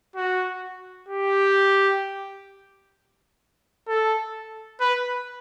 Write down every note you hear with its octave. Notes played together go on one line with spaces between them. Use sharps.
F#4
G4
A4
B4